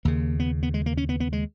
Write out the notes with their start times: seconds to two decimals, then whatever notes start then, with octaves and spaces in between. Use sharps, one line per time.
0.05 D#2 C#3 A#3
0.40 B3
0.63 B3
0.74 G#3
0.86 A#3
0.97 C#4
1.09 B3
1.20 B3
1.33 G#3